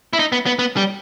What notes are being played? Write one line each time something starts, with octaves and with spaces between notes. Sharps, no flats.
E4
D#4
B3
B3
B3
G3